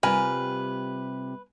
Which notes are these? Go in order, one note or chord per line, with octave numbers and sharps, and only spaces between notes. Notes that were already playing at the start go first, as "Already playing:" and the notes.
C3 G3 F4 A#4 B4 G#5